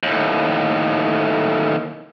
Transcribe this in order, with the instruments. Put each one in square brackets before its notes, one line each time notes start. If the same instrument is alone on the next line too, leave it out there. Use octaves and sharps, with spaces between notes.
[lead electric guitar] D#2 A2